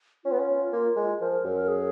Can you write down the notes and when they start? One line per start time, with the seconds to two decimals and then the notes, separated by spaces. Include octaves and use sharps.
0.25 C#4 F4
0.32 B3
0.39 C#4
0.73 A#3
0.96 G#3
1.20 F3 A#4
1.32 A#4
1.45 F#2
1.56 A#4
1.68 G#4